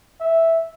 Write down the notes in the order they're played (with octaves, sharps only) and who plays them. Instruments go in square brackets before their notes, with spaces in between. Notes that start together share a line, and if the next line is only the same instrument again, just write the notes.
[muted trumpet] E5